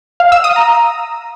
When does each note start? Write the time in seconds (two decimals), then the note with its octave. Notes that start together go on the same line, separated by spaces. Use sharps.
0.20 F5
0.32 E6
0.44 D#6
0.56 A#5